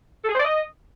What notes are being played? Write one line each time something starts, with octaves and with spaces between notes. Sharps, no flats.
A4
G#4
C5
D5
D#5